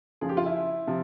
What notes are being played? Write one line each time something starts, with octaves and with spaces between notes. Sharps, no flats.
F#2 C#3 F3 G#4
G4
F4
E4
C3 F3